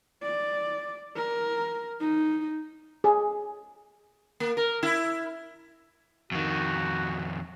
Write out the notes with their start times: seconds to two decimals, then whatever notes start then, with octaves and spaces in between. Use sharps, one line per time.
0.23 D5
1.16 A#4
2.00 D#4
3.04 G#4
4.40 A#3
4.57 A#4
4.83 E4
6.32 F2 D#3 F#4